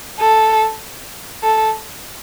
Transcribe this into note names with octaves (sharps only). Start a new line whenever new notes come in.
A4
A4